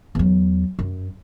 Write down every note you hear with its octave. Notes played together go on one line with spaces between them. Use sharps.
E2 F#3
F#2